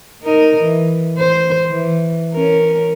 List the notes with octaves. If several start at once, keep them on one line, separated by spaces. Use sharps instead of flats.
D#4 A#4 D#5
E3
C5
E3
C#4 A#4